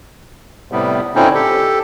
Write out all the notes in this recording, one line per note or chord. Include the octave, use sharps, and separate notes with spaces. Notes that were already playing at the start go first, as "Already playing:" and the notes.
A2 C3 G3 B3
A#2 D3 C4 C#4 D#4 E4
G4 A4